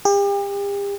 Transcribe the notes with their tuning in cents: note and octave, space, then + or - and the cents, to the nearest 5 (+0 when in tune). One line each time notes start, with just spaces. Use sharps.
G4 +40